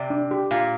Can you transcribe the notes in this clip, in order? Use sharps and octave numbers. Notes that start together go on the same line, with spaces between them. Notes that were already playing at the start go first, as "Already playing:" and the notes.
Already playing: C3 D5
D4
G4
A#2 F5